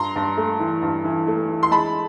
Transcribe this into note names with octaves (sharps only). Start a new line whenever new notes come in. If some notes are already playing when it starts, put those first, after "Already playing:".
Already playing: G2 A#5 C6
G2
A3
E3
G2
E3
A3
E3
C6
G#3 A5 B5